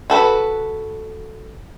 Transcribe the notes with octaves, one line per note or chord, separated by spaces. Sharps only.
F#4 A4 B4